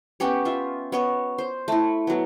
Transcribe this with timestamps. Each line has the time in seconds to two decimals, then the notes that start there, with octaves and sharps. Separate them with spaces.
0.20 B3 C#4 G4 C#5
0.45 F4 E5
0.92 B3 C#5 D#5
1.38 C5
1.68 A3 E4
2.07 F#3 B3